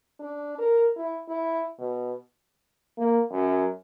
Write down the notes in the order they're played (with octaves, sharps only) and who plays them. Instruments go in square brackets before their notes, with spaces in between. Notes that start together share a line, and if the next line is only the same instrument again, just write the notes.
[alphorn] D4
A#4
E4
E4
B2
[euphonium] A#3
F#2